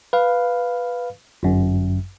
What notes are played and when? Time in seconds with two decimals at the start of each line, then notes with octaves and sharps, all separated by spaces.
0.13 B4 F5
1.43 G1 F#2